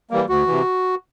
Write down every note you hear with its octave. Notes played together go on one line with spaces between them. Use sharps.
E3 G3 A#3
D2 F#4
C3 E3